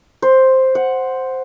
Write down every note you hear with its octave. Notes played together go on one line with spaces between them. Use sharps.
C5
F#5